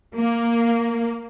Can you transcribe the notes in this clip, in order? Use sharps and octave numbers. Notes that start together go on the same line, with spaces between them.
A#3